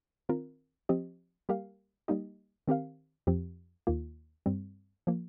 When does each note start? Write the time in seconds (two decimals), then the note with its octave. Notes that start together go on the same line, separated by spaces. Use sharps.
0.29 D#3 C4 F4 A#4
0.89 F3 C4 G4 D#5
1.49 G3 A#3 G4 A#4 F5
2.08 G3 A#3 D#4 G4 D#5
2.68 D#3 C4 G4 A#4 F5
3.27 F2 F3 C4 G4
3.87 D#2 D#3 A#3 F4
4.46 G2 G3 C4
5.07 F3 A#3